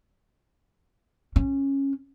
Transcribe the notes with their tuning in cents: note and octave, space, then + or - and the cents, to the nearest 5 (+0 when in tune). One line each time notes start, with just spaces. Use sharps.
C#4 -15